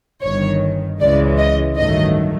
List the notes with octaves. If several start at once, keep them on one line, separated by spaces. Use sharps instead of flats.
G1 G2 D#3 C#5
C#2 C#3 E3 G#3 D5
D#5
A1 G2 D#3 F#3 A3 D#5